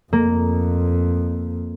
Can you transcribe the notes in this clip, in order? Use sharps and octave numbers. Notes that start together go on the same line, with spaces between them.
F2 A#3